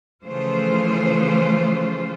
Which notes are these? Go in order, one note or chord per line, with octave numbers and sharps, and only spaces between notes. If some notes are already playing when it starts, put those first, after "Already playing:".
C#3 E3 F3 A3 F4 C5